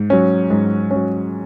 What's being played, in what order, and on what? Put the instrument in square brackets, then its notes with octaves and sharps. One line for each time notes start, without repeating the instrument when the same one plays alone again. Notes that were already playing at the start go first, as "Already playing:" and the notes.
Already playing: [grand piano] G#2
F#3 C#4
G#2
C#4
F#3